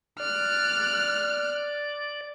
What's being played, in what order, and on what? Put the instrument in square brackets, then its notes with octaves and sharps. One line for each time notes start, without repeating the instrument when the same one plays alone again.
[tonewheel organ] D5 [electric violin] F6 F#6